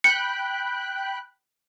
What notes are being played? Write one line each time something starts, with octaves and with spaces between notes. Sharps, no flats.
G5 B5 F#6 C#7